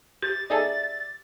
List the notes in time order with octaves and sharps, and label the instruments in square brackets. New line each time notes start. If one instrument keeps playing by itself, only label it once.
[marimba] G4 [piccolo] A6
[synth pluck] D#4 G#4 A4 [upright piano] D5 E5